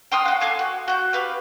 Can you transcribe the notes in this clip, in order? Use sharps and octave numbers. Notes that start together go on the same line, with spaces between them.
G5 C6 D#6 F6
F#4 F5
A4 F5 G#5 D6
F#4
F#4 G6
G4 B4 F5